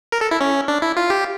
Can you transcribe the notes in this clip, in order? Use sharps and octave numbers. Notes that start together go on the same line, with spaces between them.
A#4
A4
E4
C#4
D4
E4
F4
G4